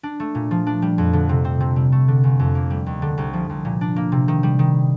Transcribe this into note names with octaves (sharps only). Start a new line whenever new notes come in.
D4
A3
A#2
F3
D4
G3
F2
D3
C3
C4
C3
G3
A3
D3
G1
F2
A#3
G3
D#2
D3
C2
F3
C2
A#2
D4
A#3
C3
D#3
G3
D#3